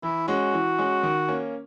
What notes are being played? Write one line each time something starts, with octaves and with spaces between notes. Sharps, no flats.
E3 E4
G#3 C#4 F#4
E3
G#3 C#4
D#3
A#3 C#4